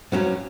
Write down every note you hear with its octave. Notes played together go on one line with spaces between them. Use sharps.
G2 F#3 C#4